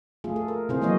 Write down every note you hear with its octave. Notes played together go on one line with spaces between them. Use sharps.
A3 F4 G#4
A4
A#4
C3 E4 G#4 C5
E3 F#3 G#3 A#3 C#5 D#5